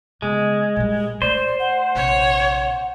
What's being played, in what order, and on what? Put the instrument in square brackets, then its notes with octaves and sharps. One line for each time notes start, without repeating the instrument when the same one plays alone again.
[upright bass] C#3 B3 [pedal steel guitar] G#3
[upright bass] A#2 G3
[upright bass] A3 [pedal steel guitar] C5 [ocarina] D5
[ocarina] F#5
[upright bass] A#1 C3 [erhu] C#5